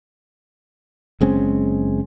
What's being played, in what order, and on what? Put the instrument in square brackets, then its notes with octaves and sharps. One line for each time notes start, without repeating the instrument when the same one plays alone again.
[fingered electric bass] F#1 G#3 C4 C#4